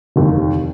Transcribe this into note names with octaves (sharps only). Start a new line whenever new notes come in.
F1 D#2 D#3